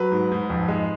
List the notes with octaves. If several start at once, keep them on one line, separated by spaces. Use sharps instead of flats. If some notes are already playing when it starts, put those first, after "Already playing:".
Already playing: F#3 B4
G#2
G#2
F2
G#3